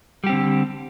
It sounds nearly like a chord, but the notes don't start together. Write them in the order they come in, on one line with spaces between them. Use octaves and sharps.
G3 G4 C4 D3